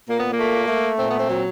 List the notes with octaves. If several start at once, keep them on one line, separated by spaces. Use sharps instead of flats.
A#2 A#3
B3
A#3
A3
A3
A#2 C4
B3
C4
F#3